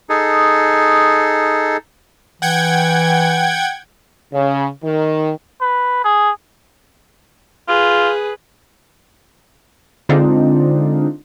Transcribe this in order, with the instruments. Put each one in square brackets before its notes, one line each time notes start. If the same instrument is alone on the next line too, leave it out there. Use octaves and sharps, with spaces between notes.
[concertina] D#4 G#4 A4
[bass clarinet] E3 [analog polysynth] F#5 G5 G#6
[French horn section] C#3
D#3
[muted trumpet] B4
G#4
[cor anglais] F4 [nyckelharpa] G#4 B4
[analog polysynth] D3 G#3 C4 D4 D#4 F4